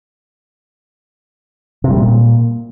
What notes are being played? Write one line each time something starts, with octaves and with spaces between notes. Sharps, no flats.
C3
G3
A#2